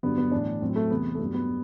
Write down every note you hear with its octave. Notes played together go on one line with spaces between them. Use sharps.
G2 D3 F#3 B3
B3
A2 E3 D4
A2 F#3 C4
A3
E2 C3 E3 B3
A3
G2 F#3 B3
B3